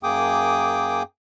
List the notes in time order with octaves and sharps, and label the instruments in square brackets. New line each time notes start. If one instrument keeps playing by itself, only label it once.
[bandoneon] F#2 A#3 G#4 G5 D6 D#6